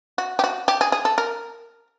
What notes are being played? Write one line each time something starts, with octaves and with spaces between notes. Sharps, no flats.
F#4
G4
F#4
G4
G#4
G#4
A4
A#4